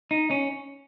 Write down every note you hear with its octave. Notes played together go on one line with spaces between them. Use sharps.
D#4
C#4